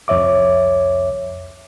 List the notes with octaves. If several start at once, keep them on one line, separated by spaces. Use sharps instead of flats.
C2 F2 C#5 E5 D6